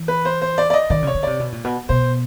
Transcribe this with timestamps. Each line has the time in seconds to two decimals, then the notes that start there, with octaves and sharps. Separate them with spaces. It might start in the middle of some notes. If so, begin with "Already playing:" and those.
Already playing: E3
0.08 B4
0.25 C5
0.42 C5
0.58 D5
0.70 D5
0.74 D#5
0.90 D#3 D5
1.03 C#3 C#5
1.15 D3
1.23 C3 D5
1.40 B2
1.52 A#2
1.64 B2
1.89 B2 C5